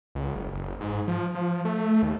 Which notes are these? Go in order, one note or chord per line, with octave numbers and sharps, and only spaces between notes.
C#2
F#1
F#1
G#2
F3
F3
A3
D#2